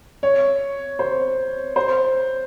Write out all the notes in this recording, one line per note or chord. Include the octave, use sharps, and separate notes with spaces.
C#5
C5
C5